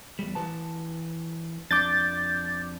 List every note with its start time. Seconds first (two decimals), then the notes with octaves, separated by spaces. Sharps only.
0.19 E2 G3
0.35 E3 B4 A5
1.71 F2 D4 D6 G6 A6